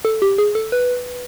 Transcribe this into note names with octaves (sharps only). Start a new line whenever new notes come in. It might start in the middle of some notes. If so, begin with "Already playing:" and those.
A4
G4
G#4
A4
B4